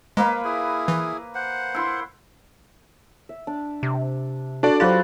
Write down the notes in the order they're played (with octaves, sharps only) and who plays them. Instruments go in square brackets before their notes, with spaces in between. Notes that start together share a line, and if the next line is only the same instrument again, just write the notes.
[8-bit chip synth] G#3 [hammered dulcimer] A#3 B4 F5
[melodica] E4 G#4
[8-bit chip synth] E3
[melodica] C5 F#5
[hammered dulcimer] E4 C6
[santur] E5
D4
[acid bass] C3
[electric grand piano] D4 F#4 D5 [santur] A4 F#5
[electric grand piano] F#3 F#6 A6 [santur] F4 B4 C5 [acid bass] G4